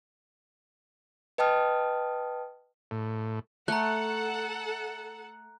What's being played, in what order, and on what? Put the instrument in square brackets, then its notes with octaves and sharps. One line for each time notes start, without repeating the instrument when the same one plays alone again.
[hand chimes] B4 D#5 G5 A5 D#6 F6
[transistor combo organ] A2
[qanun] A3 [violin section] A4 F#5 [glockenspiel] A#5 F#6